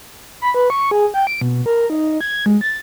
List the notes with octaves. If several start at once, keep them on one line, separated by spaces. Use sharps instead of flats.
B5
B4
C#6
G#4
G5
D7
B2
A#4
D#4
G#6
G#3
A6